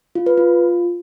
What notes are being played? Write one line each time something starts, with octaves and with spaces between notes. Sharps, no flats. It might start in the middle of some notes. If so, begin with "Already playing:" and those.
F4
B4
F4